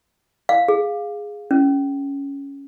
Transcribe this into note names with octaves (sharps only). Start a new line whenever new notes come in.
F5
G#4
C#4